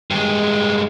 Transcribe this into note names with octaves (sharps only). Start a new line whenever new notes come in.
G2 G#3